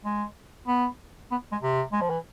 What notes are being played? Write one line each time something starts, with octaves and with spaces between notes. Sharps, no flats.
G#3
B3
B3
G#3
C3
G#3
F3
E3